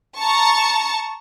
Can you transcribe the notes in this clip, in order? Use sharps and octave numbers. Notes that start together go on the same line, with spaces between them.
A5 A#5 C#6